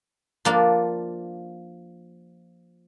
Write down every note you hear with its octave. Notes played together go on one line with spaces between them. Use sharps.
F3 A#3 D4